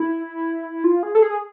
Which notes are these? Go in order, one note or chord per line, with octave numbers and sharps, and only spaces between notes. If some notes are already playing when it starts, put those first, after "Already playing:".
Already playing: E4
F4
G#4
A4
G#4